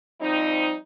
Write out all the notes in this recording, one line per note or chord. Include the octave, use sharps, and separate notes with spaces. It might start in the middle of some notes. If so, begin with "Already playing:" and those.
F3 G3 C4 D#4